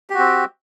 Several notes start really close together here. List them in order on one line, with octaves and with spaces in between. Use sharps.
G4 F#4 C4